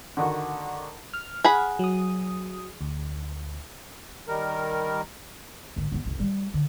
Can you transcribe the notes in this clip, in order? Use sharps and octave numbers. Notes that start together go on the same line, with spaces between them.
D3 D#3 F#4
F6
G#4 F#5 B5
F#3 D#6
D2
D#3 G3 A#4
G#1 D3
G1 B3
F#1 C2
G3 A3
D3